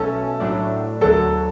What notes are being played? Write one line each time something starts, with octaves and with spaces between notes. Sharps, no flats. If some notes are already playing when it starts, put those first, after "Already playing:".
Already playing: B1 B2 A3 C#4 A4
A2 F#3 A3 D4
D2 D3 F#3 A4